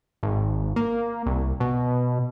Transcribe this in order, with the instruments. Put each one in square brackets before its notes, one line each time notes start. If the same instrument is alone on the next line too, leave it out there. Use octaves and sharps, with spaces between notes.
[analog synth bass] G#1
A#3
C2
B2